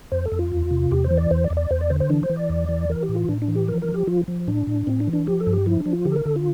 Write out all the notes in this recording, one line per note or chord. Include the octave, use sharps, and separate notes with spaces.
F2 C5
A4
F2
F4
E2
C3
E2 G4
C5
E3
D5
E2 C5
D5
E2
D5
E2 C5
D5
D3 C5
C5
E3 D4
C5
E3
D5
E2
E3
E3 A#4
G4
A2
F4
A2 D4
D4
E3
G4
F3 A#4
A#4
F3
G4
F3 F4
F3
A2 D4
A2
A2 C4
D4
E3
D4
F3 G4
A4
G2
G4
F3 E4
D4
F3
F4
D3 G4
A4
A#4
D3 A4
F4